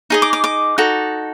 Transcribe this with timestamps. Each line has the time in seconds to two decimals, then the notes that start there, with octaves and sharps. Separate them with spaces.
0.10 D#4 G#4 D#5
0.22 D6
0.33 D6
0.44 D6
0.78 D#4 F#4 A4